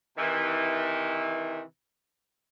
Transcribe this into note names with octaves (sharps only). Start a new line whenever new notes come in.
C3 D#3 E3